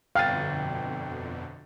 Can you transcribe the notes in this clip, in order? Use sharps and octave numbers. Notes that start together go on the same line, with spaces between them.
G1 F2 B2 D3 F5 G5 A6 D#7